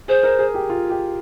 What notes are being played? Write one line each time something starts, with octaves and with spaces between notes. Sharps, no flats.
G#4 C5
A#4
G#4
G4
F4
G4